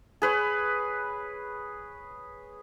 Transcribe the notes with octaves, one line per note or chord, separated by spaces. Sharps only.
G#4 B4 C#5